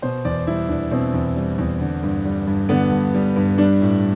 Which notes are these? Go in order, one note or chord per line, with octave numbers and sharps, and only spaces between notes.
B2 C5
E2 D5
G3 E4
E2 D4
B2 C4
E2
G3
E2
D3
G2
G3
G2
D3 B3
G2
G3
G2
G3 D4
A2